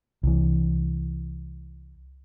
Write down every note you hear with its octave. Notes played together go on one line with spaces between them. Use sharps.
C2 E3